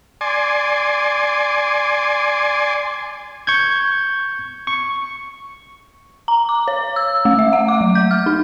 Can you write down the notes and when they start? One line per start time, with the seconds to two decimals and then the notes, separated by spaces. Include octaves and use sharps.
0.21 D5 G#5 C6
3.47 C#6 G6 G#6
4.67 C#6
6.28 A#5
6.49 D6
6.68 C#5
6.96 E6
7.25 A3
7.39 E5
7.53 F#5
7.68 D6
7.81 F#3
7.95 G6
8.11 F6
8.26 D#4